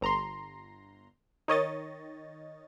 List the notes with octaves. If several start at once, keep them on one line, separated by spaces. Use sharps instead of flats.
G1 A#5 C6
D#3 C#5 D#5 A6